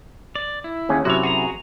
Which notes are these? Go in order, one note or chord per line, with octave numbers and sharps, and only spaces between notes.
D5
E4
D#2 C#4 G#4
F#2 C3 E4 F#4 C#5
F#4 G#4 A#5